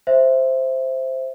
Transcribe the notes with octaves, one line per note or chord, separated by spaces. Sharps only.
C5 E5